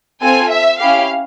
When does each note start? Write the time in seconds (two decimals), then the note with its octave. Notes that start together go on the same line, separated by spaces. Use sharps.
0.22 C4 F4 A4 G#5
0.51 E5
0.79 C#4 E4 G4 F5